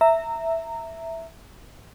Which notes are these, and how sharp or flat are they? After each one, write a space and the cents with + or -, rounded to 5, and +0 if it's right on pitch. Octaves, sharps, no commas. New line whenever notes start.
E5 +0 A#5 -20